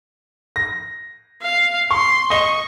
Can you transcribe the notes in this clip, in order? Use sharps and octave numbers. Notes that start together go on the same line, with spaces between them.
A#6
F5
C6 C#6
D#5 C#6 G7